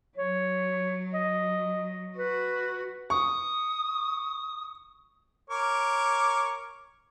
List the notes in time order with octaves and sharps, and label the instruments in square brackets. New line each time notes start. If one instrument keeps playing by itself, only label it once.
[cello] F#3 [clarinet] C#5
[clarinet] D#5
[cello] F#4 [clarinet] B4
[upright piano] C#6 [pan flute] D#6
[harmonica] A#4 C#5 D6